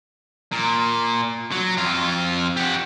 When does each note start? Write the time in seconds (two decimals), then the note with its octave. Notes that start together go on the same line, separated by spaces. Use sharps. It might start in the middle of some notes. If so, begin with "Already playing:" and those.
0.52 A#2
1.52 F#3
1.78 F2 F4
2.57 G4 F#5